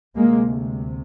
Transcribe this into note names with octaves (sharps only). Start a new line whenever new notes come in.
D2 C3 G#3 A#3